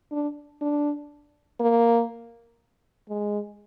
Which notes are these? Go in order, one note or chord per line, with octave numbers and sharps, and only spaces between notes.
D4
D4
A#3
G#3